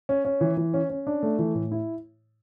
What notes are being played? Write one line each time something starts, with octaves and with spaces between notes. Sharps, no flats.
C#4
C#4
E3
E3
C#4
C#4
D4
A3
E3
A2
E4